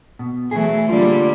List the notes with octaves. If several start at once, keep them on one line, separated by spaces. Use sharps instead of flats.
B2
E3 F#3 A3 G#4
D3 G3 A#3 F4 D5